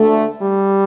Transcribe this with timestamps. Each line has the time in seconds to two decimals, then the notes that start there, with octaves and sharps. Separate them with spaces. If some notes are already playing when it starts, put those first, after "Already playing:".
Already playing: D2 D3 A3
0.42 G3